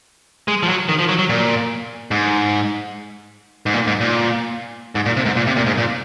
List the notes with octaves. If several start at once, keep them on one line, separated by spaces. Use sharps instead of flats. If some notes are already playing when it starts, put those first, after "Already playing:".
G#3
F3
F#3
D#3
F3
F#3
F#3
A#2
G#2
G#2
A#2
G#2
A#2
G#2
A#2
C3
G#2
A#2
C3
A#2
G#2
A#2